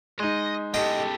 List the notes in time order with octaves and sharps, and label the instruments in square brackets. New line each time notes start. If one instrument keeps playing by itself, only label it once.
[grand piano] G#3 D#4 [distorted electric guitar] D#5
[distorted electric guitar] E2 C#3 [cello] G4 A4 [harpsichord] D#5 G5